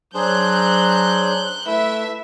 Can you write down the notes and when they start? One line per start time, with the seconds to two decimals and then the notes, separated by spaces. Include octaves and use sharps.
0.14 F#3 D4 G#4 C5 F#6 G6
1.66 A3 E4 B4 E5